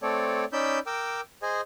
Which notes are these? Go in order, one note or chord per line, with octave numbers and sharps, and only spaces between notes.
A3 C4 A4 C#5 D5
C#4 D#4 D5 B5 E6 G6
A#4 G5 D6 E6
G#4 C5 D#5 G#5